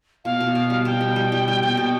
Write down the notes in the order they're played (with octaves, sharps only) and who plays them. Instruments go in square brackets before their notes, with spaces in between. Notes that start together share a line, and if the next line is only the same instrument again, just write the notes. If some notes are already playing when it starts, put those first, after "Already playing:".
[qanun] B2 [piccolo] F5
[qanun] B2
B2
G3
[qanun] B2 [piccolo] G5
[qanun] G3
G3
G3
G3
B2
B2